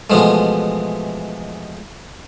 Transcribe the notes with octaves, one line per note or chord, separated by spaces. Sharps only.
B2 E3 F3 G#3 A3